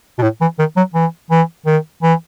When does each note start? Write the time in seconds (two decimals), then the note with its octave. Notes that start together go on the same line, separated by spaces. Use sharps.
0.18 B2
0.22 A2
0.41 E3
0.59 D#3
0.76 F#3
0.94 E3
1.31 E3
1.66 D#3
2.02 E3